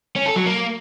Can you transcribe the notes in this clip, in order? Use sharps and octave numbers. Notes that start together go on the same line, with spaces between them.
C#4
A4
F#3
A#3